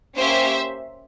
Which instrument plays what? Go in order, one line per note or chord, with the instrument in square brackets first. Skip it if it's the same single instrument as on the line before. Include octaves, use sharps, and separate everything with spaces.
[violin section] A#3 C#4 G4 C5 E5